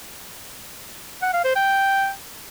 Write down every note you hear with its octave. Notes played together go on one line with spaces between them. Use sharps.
F#5
F5
C5
G5